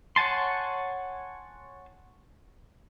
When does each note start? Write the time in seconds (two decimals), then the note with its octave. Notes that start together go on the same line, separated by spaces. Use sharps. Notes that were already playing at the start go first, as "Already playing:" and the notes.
0.16 C#5 F#5 G#5 A5 C6